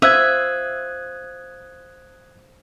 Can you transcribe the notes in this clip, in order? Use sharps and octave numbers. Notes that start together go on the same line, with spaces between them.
C5 E5 F5 D#6 F#6 G#6